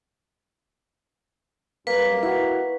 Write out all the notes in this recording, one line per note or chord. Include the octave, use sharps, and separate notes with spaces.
F#2 G3 A#3 B4
E4 F#4 B4